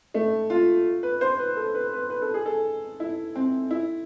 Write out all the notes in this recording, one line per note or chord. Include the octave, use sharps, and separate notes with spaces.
A3
F4
B4
C5
B4
A4
B4
B4
B4
A4
G#4
A4
E4
C4
E4